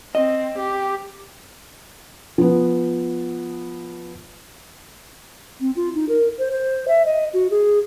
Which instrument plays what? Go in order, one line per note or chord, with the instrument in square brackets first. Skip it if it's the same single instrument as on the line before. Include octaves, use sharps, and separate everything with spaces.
[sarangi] C4 [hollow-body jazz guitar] D#5
[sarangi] G4
[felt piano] F3 B3
[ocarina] C4
F4
D#4
A#4
C5
C5
E5
D#5
F#4
G#4